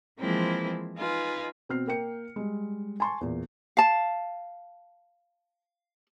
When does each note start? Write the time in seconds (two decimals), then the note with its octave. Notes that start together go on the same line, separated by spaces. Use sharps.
0.19 E3 F3 G#3 A#3 C4 E4
0.97 D#4 F4 G#4 B4
1.69 B2 C4 F6 C7
1.87 A#3 G5 C#7
2.36 G3 G#3
3.00 G#5 A5 C6 C#6
3.21 E2 A#2
3.77 F5 A5